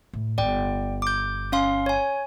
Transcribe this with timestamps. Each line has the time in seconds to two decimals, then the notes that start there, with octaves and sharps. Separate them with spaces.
0.13 A2
0.38 G1 D5 G5
1.02 D6 G6
1.52 C#4 F5 C6
1.86 C#5 G#5